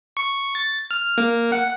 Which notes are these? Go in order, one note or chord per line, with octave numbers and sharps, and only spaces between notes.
C#6
A6
F6
A#3
F#5